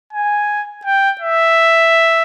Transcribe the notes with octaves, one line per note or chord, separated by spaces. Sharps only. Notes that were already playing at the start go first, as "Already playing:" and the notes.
G#5
G5
E5